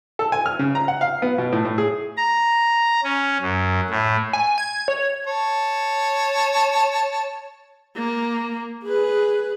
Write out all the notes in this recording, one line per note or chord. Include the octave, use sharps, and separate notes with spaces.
A4
G#5
F6
C#3
A#5
F#5
F5
B3
B2
A2
A2
G#4
A#5
C#4
F#2
A2
G#5
G#6
C#5
C#5 A5
A#3
G#4 B4